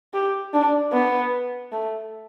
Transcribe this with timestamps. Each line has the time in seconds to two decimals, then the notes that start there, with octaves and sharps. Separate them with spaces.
0.14 G4
0.54 D4
0.93 B3
1.72 A3